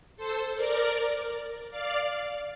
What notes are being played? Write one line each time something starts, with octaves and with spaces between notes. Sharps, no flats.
A4 C5
A#4 D5
D5 F5